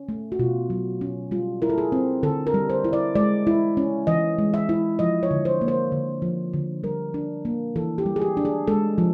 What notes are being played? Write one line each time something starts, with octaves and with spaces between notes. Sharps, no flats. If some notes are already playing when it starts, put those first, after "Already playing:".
Already playing: C#4
A3
F#4
B2 F4
F#3
C#4
G3 F4
E4 A#4
A4
G#4
C4
D3 A4
A#4
G3
C5
E4
D5
G#3 D5
E4
C#4
E3 D#5
G#3
E5
E4
F3 D#5
C#5
D3
C5
A#3
C5
D3
F3
D3
G3 A#4
D4
A#3
E3 A4
G4
G3
G#4
G4
D4
G#4
G#3 A4
F3